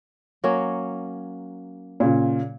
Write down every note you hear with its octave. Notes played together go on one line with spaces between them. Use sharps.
F#3 A#3 C#4
A#2 C#3